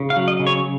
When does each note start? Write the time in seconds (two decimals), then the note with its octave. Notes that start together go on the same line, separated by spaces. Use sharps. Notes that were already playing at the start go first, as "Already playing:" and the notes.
Already playing: C#3
0.10 F5
0.16 F#3
0.28 D#5
0.40 C#3
0.47 C#5